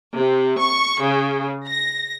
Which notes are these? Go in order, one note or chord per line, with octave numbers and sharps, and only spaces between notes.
C3
C#6
C#3
A#6